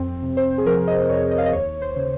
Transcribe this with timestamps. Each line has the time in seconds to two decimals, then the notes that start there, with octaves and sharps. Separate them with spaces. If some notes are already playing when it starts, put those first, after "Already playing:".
Already playing: F2 C4
0.23 C3
0.37 C5
0.58 G#4
0.66 F3 A#4
0.87 D#5
1.09 F2 C#5
1.31 D#5
1.38 F5
1.46 D#5
1.52 D#2 C#5
1.82 C5
1.96 C#3